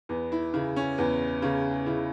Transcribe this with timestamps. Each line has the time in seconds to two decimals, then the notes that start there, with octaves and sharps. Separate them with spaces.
0.09 E2 B3
0.32 E4
0.54 C#3 E4
0.76 C#4
0.98 E2 B3
1.42 C#3 C#4
1.86 C#3 E4